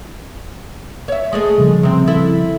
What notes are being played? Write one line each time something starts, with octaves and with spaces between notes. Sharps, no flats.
C#5 E5
G#3 A3 G#4
C#3 F3 G3
C3 C4
E4 A4